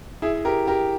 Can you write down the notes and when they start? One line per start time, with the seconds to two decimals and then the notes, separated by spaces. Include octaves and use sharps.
0.22 E4 G#4
0.45 G4 A#4
0.67 G4 A#4